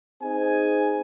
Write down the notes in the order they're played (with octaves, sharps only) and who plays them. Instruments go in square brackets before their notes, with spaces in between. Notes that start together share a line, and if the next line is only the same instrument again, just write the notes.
[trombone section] C4 D#4 G#4 [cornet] G#5